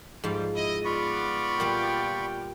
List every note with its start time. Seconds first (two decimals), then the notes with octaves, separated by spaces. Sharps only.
0.24 G#2 F3 G3 F5
0.55 E4 D#5
0.85 B3 F4 D5 B5 C#6
1.60 A#2 G3 B4 G5